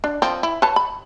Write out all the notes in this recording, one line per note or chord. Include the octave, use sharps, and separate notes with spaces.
D4
F3 C4
E4
B4 C#5 A5
B5